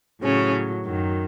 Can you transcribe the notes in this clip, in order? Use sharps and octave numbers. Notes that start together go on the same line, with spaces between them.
A2 C#3 F#3 C#4
F#2 D#3 F#3